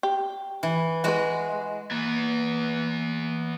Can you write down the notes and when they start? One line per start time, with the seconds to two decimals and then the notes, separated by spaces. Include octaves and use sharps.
0.03 G4
0.63 E3
1.04 E3 G#3 F#4 B4
1.91 E3 A#3 B3